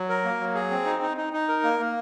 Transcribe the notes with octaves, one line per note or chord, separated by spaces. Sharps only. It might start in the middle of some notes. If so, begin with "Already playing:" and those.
Already playing: F#3
A#4
A#3
F#3
G#4
C4
D#4
D#4
D#4
D#4
A#4
A#3
A#3